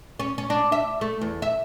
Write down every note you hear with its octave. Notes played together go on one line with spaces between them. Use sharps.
C#4
C#4
D4
E5
A3
E2
E5